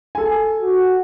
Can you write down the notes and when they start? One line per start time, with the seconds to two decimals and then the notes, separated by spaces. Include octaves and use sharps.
0.15 A4 G#5
0.61 F#4